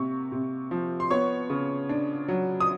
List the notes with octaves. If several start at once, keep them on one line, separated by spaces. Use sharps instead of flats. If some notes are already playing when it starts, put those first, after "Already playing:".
Already playing: C3 A#3 C#6
C3
F3
C6
B3 C#5 C#6
C#3
D4
F#3
D#6